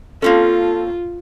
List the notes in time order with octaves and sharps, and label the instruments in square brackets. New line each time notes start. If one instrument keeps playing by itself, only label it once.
[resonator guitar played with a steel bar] A#3 C4 C#4 [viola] F4 [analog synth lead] A4